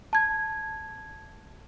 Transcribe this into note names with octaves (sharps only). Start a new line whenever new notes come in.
A5 G#6